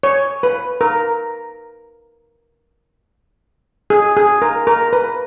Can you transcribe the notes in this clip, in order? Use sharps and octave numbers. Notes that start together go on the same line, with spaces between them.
C#5
B4
A#4
G#4
G#4
A#4
A#4
B4